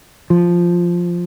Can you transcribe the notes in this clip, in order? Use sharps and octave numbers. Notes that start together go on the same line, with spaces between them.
F3